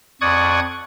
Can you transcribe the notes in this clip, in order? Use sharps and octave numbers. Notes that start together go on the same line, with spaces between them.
F2 D5 C#6 D#6 F#6 G#6